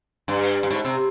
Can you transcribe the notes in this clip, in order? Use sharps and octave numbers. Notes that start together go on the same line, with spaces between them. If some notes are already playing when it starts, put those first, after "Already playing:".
G2
G2
G#2
C3